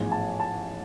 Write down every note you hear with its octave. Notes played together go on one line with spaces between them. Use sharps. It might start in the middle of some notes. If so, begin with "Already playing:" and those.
Already playing: A1 G#2 F3 G#3 B3 G#5
A5
A5